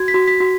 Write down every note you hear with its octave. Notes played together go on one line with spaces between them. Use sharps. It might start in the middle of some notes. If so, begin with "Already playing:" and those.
Already playing: F#4 G#6
B6
F#4
B6
F#4